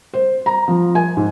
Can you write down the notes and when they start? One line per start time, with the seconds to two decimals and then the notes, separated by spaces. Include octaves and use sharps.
0.14 C5
0.46 A#5
0.68 F3
0.95 G#5
1.17 G#2